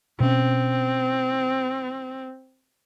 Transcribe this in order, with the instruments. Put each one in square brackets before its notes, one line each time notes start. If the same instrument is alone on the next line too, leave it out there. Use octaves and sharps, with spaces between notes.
[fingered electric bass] B2 C#4 [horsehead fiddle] C4